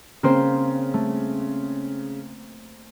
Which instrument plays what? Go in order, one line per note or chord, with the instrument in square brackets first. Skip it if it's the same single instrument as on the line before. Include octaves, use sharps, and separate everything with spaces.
[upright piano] C#3 [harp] A#3 C4 C5
[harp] A3